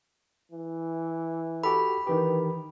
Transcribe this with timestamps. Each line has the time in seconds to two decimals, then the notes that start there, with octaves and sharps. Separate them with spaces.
0.52 E3
1.64 F#4 G4 A4 B5
2.07 D#3 E3 G4 B4